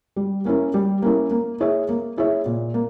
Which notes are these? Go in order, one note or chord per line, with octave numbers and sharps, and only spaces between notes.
G3
A#3 C#4 E4 A#4
G3
A#3 C#4 E4 A#4
A#3
E4 G#4 C#5 E5
A#3
E4 G#4 C#5 E5
A#2
A#3